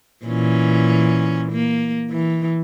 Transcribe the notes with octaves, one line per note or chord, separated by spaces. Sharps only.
A#2 E3 C#4
A#3
E3